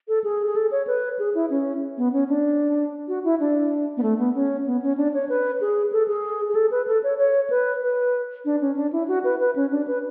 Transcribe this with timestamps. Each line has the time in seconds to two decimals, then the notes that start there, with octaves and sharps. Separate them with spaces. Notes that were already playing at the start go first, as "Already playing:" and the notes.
0.08 A4
0.24 G#4
0.46 G#4
0.56 A4
0.71 C#5
0.87 B4
1.19 G#4
1.35 E4
1.50 C#4
1.97 B3
2.13 C#4
2.29 D4
3.08 F#4
3.24 E4
3.40 D4
3.97 B3
4.03 A3
4.19 B3
4.35 C#4
4.66 B3
4.82 C#4
4.97 D4
5.14 C#5
5.29 B4
5.61 G#4
5.92 A4
6.08 G#4
6.49 G#4
6.55 A4
6.71 B4
6.87 A4
7.03 C#5
7.18 C#5
7.50 B4
7.82 B4
8.45 D4
8.61 C#4
8.77 D4
8.93 E4
9.08 F#4
9.24 B4
9.40 B4
9.56 C#4
9.71 D4
9.88 B4